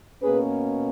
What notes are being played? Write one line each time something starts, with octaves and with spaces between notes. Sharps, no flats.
B2 A#3 C#4 G#4 B4